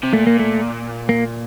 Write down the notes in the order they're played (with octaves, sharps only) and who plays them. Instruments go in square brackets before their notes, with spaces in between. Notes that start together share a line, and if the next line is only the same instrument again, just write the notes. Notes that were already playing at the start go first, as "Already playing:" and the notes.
[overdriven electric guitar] C3
[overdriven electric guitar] A#2 [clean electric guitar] A3
[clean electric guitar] A#3
A3
A#3